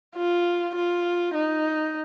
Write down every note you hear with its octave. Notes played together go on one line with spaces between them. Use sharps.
F4
F4
D#4